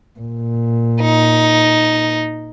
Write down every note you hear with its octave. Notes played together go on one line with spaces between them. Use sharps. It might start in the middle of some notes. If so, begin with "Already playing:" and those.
A#2
D#4